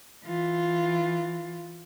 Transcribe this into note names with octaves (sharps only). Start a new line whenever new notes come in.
E3 F4